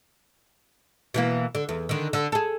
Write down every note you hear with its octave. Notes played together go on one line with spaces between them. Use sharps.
B2 E3 A#3
D3
E2
D3 D#3
D3
G#4 A4